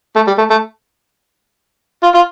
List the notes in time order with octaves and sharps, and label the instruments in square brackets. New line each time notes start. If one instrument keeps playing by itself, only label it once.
[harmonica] A3
G3
A3
A3
F4
F4